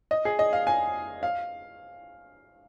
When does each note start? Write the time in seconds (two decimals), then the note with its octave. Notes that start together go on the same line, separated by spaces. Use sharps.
0.11 D#5
0.25 G#4
0.39 D#5
0.53 F5
0.67 G#5
1.23 F5